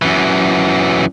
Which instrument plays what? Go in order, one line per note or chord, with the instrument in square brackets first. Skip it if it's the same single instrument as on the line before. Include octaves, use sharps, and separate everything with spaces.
[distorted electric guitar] F#2 E3